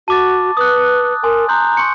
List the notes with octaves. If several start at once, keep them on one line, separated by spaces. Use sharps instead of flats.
F#4 A5 D6 A6
B4 D#6 F#6
A#4 G#5 C6 D#6
A#5 C6 F#6 G6
C6 C#6 C#7